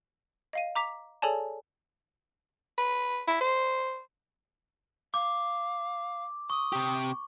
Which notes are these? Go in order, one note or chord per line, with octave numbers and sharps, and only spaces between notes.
D#5 F5 D#7
A#5 D6 B6 F7
G#4 A4 C#5 D5 G#5 A5
B4
E4
C5
F5 D6
C#6 D#6
C3 G4